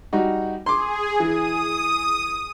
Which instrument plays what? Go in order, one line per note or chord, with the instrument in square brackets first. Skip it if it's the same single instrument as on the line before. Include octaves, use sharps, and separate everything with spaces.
[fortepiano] G3 D#4 F#4
[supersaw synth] G#4 [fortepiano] C6 D6
[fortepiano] E3 [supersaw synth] D#6